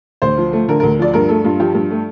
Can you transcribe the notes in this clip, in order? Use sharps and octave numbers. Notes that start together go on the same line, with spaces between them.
D2 C5
F3
A3
D3 A#4
D2 A#4
F3 D5
G2 A#4
A3 A4
G2 F4
F3 G4
G2
A3